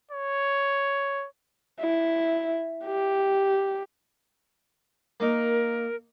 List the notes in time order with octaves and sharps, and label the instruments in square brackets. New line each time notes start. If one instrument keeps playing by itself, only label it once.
[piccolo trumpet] C#5
[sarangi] E4
G4
[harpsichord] A#3 D#4 [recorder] A#4